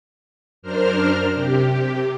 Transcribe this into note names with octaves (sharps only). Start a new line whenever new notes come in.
F#2 D4 A#4 C5 F6
C3 G4